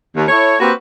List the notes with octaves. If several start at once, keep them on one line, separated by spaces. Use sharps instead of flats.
D#2
E4 A4 C#5
A#3 C4 F#4 G4 B4